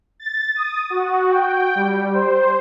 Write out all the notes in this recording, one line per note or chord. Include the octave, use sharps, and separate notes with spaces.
A6
D#6
F#4
G5
G3
C5